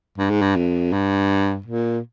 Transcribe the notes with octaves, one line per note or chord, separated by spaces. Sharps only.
G2
G#2
G2
F2
G2
A#2